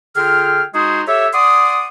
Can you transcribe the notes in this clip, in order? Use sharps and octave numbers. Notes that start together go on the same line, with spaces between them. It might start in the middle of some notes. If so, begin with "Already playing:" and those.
D3 F4 G#4 G5 F6
G#3 D#4 F#4 G#4 C5 D#6
G4 A4 C#5 E5
D5 F#5 C6 D6 D#6